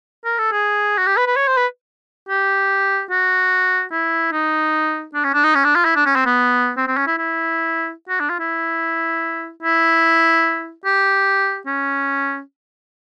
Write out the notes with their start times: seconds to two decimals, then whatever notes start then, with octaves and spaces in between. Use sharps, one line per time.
0.25 A#4
0.38 A4
0.52 G#4
0.98 F#4
1.06 G4
1.17 B4
1.27 B4
1.36 C#5
1.47 C5
1.57 B4
2.29 G4
3.10 F#4
3.91 E4
4.32 D#4
5.14 D4
5.24 C#4
5.34 D4
5.44 D#4
5.55 C#4
5.64 D4
5.75 F4
5.85 E4
5.96 D4
6.06 C#4
6.15 C4
6.26 B3
6.77 C4
6.88 C4
6.97 C#4
7.07 E4
7.18 E4
8.09 F#4
8.20 D4
8.29 F4
8.40 E4
9.63 E4
10.85 G4
11.67 C#4